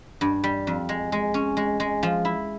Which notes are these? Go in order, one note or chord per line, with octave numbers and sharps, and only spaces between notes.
G2
G3
F2
G#3
G#3
C#4
G#3
G#3
F3
E4